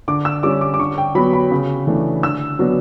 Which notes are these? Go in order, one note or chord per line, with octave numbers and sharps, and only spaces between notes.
D3 D6
E6
G3 C#4 D6
D6
D6
D3 C#6
G5
F#3 B3 B5
B5
C#3
E3 A3 D4
D3 E6
F#3 B3 D4